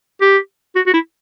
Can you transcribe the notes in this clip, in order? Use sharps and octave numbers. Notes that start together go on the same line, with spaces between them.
G4
F#4
F#4
E4